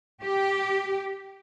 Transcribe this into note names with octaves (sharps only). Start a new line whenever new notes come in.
G4